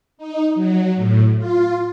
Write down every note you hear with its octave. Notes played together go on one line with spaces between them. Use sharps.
D#4
F#3
A2
F4